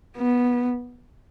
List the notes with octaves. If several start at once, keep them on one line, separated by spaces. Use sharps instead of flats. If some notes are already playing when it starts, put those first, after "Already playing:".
B3